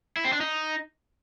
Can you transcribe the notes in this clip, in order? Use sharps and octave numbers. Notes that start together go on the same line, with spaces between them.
E4
C4
D4
D#4